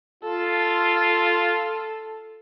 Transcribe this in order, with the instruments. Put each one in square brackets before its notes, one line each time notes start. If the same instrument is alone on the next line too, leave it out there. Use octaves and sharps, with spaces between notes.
[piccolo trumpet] F4 [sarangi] A4